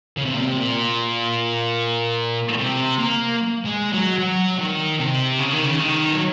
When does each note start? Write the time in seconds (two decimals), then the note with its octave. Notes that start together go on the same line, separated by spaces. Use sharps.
0.17 C#3
0.25 C3
0.34 A#2
0.41 C3
0.57 A#2
2.58 C3
2.99 A#3
3.65 G#3
3.93 F#3
4.19 F#3
4.59 D#3
5.00 C3
5.39 C#3
5.53 D#3
5.66 C#3
5.80 D#3
6.13 F#3